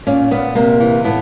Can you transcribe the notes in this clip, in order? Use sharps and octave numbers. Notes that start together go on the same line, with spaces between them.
A#2 C#4
A#2 B3
C3 A#3
E3
A2 B3